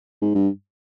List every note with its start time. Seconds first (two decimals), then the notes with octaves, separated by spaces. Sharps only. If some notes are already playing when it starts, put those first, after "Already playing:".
0.22 G#2
0.35 G2